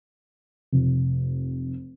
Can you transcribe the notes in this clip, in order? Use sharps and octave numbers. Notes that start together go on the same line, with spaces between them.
F1